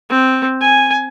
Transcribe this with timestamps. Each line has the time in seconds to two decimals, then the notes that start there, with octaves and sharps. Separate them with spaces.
0.10 C4
0.61 G#5